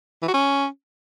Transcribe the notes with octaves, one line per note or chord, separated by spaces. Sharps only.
E3
F#4
C#4